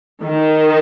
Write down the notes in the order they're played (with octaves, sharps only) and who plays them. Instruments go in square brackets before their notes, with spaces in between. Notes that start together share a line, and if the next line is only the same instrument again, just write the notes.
[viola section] D#3